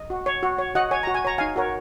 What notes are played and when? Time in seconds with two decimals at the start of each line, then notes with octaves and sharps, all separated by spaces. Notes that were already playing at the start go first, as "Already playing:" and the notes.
Already playing: D#5
0.10 F#4
0.26 C#5
0.43 F#4
0.58 C#5
0.75 F#4 D#5 F#5
0.91 C#5 G#5
1.03 F#4 A#5
1.15 G#5
1.25 C#5 A#5
1.38 D#4 F5 G#5
1.56 F#4 A#4 C#5